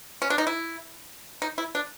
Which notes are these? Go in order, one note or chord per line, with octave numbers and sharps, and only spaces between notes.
C#4
D4
D#4
E4
D#4
E4
D4